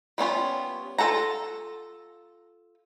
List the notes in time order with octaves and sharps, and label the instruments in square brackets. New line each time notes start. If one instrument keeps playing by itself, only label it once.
[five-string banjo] G3 B3 C#4 F4
F4 F#4 A4 F#5 A#5